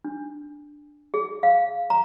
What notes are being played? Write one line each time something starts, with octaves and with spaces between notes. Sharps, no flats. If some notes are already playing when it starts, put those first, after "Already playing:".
D4
G#4
F5
A#5